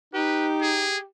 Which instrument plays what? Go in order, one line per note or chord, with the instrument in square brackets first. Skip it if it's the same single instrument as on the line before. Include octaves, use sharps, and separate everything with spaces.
[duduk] D#4 [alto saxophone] G4 [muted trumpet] B4
[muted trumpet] G#4